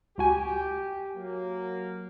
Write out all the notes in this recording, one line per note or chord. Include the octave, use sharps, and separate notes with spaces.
C#2 F#4 G4 G#5
F#3 A#3